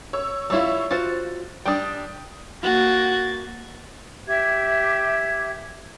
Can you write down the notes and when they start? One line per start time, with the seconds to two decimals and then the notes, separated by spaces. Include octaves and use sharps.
0.13 C#5 E6
0.50 G3 E4 F4 C#5 E6
0.91 F4 F#4 C5 A6
1.66 G3 D4 G5 D#6
2.63 A#3 F#4 G#6 A6
4.27 G4 E5 G#6